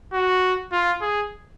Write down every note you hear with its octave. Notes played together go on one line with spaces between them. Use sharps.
F#4
F4
G#4